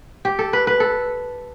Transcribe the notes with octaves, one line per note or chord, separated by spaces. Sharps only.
G4
A4
B4
B4
A4